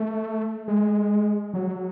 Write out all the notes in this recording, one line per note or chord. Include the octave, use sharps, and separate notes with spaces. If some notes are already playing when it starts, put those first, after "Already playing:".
Already playing: A3
G#3
F#3